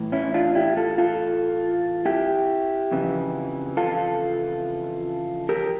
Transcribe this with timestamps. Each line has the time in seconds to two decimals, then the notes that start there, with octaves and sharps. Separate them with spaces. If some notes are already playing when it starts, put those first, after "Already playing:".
Already playing: A2 E3
0.12 C#4 E4
0.34 D4 F4
0.55 E4 G4
0.77 F4 A4
0.98 F4 A4
2.05 E4 G4
2.91 F2 C#3 E3
3.77 F4 A4
5.49 G4 A#4